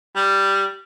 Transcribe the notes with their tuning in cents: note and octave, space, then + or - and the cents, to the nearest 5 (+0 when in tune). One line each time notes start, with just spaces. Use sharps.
G3 +0